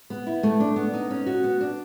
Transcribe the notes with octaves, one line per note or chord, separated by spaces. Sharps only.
B3
E4
A3
D4
B3
D#4
C#4
F#4
B3
D4